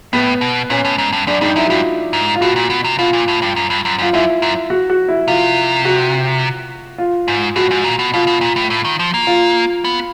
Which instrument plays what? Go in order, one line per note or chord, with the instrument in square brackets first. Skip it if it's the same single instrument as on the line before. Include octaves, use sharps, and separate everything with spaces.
[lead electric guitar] A2 [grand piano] B3
[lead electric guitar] B2
[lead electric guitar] A#2 [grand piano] C#4
[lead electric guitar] A2
G#2
G2
[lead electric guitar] F#2 [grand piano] D4
[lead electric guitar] G2 [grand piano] D#4
[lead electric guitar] F#2 [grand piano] E4
[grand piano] F#4
[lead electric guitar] G2 [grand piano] F4
[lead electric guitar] G#2
[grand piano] F4
[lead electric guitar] A2 [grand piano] F#4
[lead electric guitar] A#2
B2
C3
[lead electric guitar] B2 [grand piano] F4
[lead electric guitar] A#2
A2
G2
F#2
G2
F#2
[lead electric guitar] F#2 [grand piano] F4
[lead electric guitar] F#2 [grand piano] E4
[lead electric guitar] F#2
[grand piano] F#4
F#4
E4
[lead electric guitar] C3 [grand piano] F4
[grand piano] F#4
F4
[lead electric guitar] G#2
[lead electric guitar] A2 [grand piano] F#4
[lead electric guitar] G#2
A#2
B2
[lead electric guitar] B2 [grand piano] F4
[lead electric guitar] B2
A#2
A2
A2
D#3
F3
A#3
[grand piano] F4
[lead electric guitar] B3